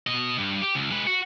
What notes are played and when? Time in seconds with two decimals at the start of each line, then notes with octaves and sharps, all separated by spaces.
0.07 B2 D#5
0.38 G2
0.62 G4
0.75 C#2
0.91 G#3 B4
1.07 F#4